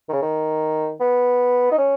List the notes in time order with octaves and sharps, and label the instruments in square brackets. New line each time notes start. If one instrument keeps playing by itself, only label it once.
[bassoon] D#3
C#3
D#3
B3
D#4
C#4